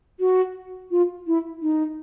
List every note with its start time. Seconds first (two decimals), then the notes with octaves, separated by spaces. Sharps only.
0.20 F#4
0.91 F4
1.27 E4
1.62 D#4